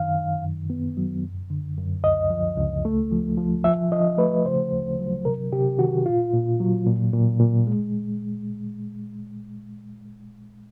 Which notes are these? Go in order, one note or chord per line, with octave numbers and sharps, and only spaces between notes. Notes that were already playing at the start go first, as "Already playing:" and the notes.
Already playing: F#2 D#3 F5
D#3
F#2
B3
F#3
F#2
D3
F#2
C#2 D#5
F3
C#2
A3
F3
F3
F3 E5
F3 D#5
A3 B4
C#3 C5
D2
F#3
C3 A#4
C3 G4
D#3 F#4
A#2 F4
A#2
F#3
A#2
A#2
A#2
G#3